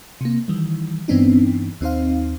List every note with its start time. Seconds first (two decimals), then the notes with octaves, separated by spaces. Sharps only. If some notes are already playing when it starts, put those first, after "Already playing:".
0.21 C3 A#3
0.48 D#3 E3 G3
1.08 G2 E3 B3 C4 D4 D#4
1.81 D#2 C4 D#4 C5 F5